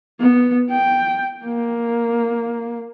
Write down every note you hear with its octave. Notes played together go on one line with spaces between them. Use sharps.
B3
G5
A#3